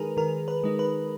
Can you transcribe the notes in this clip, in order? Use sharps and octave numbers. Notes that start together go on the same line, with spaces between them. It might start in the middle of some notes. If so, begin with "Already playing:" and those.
Already playing: D#3 G#3 D#4 G#4 A#4 B4
D#3 A#4
B4
G#3 D#4
B4